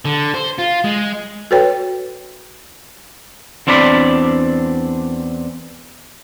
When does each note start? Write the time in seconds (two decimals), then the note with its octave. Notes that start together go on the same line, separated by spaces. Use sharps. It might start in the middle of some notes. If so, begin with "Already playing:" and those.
0.05 D3
0.34 C5
0.58 F4
0.84 G#3
1.51 F#4 A4 B4 C#5 G5
3.67 E2 C4 D4 D5 B5